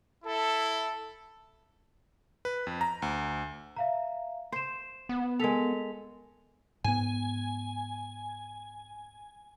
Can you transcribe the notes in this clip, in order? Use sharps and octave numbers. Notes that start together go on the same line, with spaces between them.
E4 A4
B4
F2
A#5
D2
E5 F5 A#5
C5 C7 E7
B3
G#3 A4 A#4 B6 F7
G#2 B3 G#5